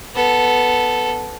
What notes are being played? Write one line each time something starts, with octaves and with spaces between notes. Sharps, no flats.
B3 A4